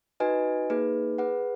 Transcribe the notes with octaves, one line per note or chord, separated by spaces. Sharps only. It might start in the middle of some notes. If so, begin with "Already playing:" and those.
D#4 F#4 B4 D#5 G#5
A#3 D#4 G#4 B4
G#4 B4 F#5